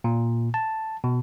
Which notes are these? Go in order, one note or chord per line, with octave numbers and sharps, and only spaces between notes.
A#2
A5
B2